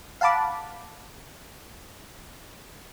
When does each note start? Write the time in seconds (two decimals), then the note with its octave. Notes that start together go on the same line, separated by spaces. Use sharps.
0.21 F5 F#5 A5 B5 D6